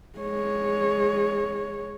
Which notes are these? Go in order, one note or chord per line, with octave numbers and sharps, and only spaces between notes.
G#3 C#5